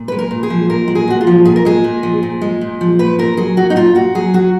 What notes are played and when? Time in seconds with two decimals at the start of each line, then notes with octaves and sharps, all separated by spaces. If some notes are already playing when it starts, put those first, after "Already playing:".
Already playing: A#2
0.08 G#3 B4
0.19 A#4
0.31 A#2
0.43 G#4
0.50 F3
0.70 A#2 A#4
0.88 G#3
0.95 G#4
1.08 A#2 F#4
1.21 F4
1.27 F3
1.45 A#2 G#4
1.56 A#4
1.65 G#3 G#4
1.84 A#2
2.03 F3
2.23 A#2
2.42 G#3
2.61 A#2
2.81 F3
2.99 A#2 B4
3.19 A#2 A#4
3.37 F#3 G#4
3.57 F#3 F#4
3.70 D#4
3.76 A#2 F4
3.95 A#2 F#4
4.15 F#3 G#4
4.34 F#3 F#4